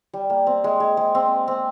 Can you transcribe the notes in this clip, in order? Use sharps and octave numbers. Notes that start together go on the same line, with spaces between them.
G3
A#3
C4
G#3
G#3
G#3
C4
C4